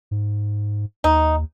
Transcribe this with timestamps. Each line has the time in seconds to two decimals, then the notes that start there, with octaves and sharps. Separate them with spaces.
0.11 G#2
1.04 D#2 D#4